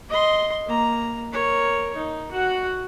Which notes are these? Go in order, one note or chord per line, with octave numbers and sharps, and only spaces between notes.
D#5 C6
A#3 A#5
A#4 C#5
D#4
F#4 F#5